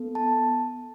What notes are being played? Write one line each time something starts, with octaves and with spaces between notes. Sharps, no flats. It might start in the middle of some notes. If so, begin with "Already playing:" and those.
Already playing: B3 A4
A5